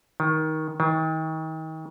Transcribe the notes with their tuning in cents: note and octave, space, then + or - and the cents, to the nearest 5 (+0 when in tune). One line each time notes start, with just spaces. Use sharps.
D#3 +15
D#3 +35